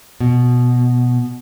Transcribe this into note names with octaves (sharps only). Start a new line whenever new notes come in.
B2